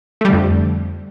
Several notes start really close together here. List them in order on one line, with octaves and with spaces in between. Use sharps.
A3 G3 D3 F2